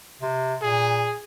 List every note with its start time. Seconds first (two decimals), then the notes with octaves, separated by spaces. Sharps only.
0.22 C3
0.62 A#2 G#4